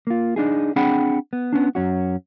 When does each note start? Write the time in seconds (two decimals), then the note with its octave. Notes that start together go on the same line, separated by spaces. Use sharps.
0.07 A#3 F4
0.36 D4 D#4 G#4
0.76 C4 D4 G#4 F#5 G5 B5
1.33 B3
1.53 B3 C#4 D4
1.75 F#2 C#4 F#4